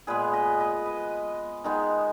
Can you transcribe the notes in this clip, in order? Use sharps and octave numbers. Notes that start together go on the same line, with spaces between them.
A#2 G#3 B3 G#4 B4
B4 D#5
B4 D#5
B4 D#5
D#3 G#3 B3 D#4